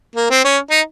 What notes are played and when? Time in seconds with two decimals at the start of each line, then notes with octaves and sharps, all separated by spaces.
0.16 A#3
0.30 C4
0.44 C#4
0.71 D#4